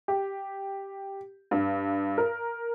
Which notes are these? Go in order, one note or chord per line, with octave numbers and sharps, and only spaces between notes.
G4
G2
A#4